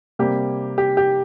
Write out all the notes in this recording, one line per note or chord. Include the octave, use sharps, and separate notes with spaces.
C3 G3 A#3 G4
G4
G4